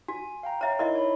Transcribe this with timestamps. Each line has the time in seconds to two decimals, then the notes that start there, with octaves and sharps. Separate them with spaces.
0.08 F#4 G#5
0.43 F5 G5 A#5
0.61 C#5 E5 A#5
0.79 D#4 E4 A#4 D#5 E5 C6
0.95 C#5 B5